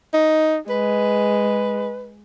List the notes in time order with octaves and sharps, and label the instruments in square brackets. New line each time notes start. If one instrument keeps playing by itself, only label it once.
[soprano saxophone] D#4
[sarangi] G#3 [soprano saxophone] B4